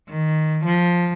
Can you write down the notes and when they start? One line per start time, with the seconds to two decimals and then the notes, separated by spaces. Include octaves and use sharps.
0.09 D#3
0.65 F3